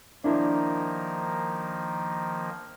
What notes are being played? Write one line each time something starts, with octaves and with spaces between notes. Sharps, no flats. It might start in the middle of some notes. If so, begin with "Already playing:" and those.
D#3 F3 A#3 D4 E4 A#4